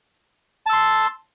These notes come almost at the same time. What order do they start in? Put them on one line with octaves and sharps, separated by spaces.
A5 E6 C6